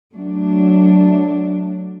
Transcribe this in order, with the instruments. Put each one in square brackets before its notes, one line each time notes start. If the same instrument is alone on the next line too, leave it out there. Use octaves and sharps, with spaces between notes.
[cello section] F#3 A3 D4